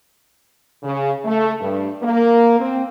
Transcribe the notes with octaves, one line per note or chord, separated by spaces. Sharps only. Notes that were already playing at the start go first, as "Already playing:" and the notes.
C#3
A3
G2
A#3
C4